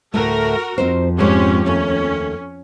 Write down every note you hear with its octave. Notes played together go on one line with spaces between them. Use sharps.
D2 A2 A3 F#4 A#4
F2 C4 D#4 C5
G#2 G#3 C#4 G4 C5
D#2 A3 C#4